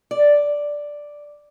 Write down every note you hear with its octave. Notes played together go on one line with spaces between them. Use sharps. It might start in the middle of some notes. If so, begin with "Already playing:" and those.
D5